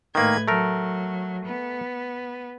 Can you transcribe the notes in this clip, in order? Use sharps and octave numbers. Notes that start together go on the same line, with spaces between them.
A2 D#3 A#3 B4 G#6
F#3 A3 A#4
B3